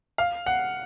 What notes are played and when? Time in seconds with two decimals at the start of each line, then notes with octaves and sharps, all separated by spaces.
0.18 F5
0.46 F#5